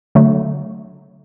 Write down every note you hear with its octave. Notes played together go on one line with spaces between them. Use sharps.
D3 F#3 A3